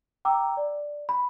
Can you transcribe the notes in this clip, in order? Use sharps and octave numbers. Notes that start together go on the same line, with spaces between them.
G5 A#5 D6 E6
D5
B5